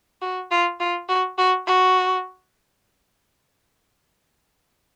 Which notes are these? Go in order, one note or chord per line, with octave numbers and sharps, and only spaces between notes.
F#4
F4
F4
F#4
F#4
F#4